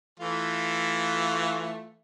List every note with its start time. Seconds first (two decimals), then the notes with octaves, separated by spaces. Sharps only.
0.20 E3 A3 F4